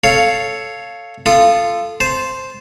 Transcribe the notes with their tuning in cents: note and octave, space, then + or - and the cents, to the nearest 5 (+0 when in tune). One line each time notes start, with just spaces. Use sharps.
A4 +0 C#5 +0 F5 +0
F4 -20 A4 +0 D#6 -25
C5 +0 A5 -15